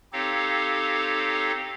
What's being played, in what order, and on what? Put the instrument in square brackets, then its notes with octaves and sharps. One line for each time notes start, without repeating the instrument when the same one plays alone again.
[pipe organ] C4 D#4 G4 A4 C#5 F5